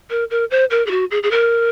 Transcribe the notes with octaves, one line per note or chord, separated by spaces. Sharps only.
A#4
A#4
C5
A#4
G#4
F#4
G#4
G#4
A#4